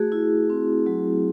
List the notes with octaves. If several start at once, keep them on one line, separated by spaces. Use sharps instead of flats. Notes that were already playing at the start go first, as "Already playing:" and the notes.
Already playing: A3 F#4 G#4
E4
C4
F#3